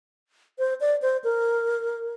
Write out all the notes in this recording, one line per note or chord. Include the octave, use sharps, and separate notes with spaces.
C5
D5
C5
A#4